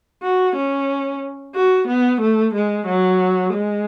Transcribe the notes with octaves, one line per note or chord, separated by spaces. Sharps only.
F#4
C#4
F#4
B3
A3
G#3
F#3
G#3